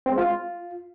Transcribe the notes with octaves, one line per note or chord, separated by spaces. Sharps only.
C4
G#3
F4